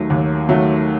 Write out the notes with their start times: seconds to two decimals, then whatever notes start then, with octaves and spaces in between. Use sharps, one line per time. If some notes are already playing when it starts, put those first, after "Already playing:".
Already playing: D#2 D#3 F#3 A3
0.10 D#2
0.49 D#3 F#3 A3